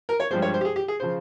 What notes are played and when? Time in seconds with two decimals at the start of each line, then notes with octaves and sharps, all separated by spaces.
0.09 A#4
0.20 C#5
0.31 G2 F3 G#3 C5
0.42 C#5
0.54 C5
0.61 G4
0.65 G#4
0.76 G4
0.88 G#4
1.00 C#3 F3 C5